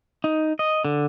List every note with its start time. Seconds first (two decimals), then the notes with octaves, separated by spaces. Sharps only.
0.24 D#4
0.59 D#5
0.85 D3